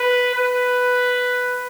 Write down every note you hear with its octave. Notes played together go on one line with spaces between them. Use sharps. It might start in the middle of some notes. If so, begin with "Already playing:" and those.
Already playing: B4
B4